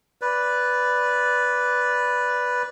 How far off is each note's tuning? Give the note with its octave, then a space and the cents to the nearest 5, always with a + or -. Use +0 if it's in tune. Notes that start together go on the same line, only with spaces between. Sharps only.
B4 +0 D5 -10